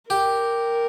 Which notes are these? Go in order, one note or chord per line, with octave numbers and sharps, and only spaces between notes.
G4 A#4